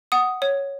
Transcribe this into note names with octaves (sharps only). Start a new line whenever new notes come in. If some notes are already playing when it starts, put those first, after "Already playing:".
F#5 D#6
C#5